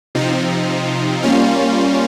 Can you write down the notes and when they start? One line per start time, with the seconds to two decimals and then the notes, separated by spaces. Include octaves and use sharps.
0.15 C3 F3 C4 D#4
1.23 G3 A#3 C#4 F4